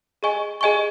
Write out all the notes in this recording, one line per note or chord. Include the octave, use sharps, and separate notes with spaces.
G#4 D#5 G#5 C#6
G#4 D#5 G#5 C#6